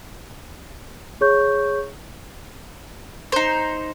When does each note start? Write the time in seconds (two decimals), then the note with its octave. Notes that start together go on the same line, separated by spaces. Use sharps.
1.21 G#4 C#5 C#6 G6
3.32 D#4 C5